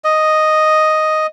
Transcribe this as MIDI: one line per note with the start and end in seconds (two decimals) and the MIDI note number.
0.04 1.27 75